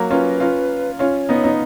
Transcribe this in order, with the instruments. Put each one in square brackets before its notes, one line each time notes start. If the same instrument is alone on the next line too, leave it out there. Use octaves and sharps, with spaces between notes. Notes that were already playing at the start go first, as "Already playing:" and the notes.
Already playing: [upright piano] F#3 A#3
[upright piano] C#4 F4 [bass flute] B4
[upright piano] C#4 F4
[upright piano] C#4 F4 [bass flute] C#5
[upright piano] B3 D#4
B3 D#4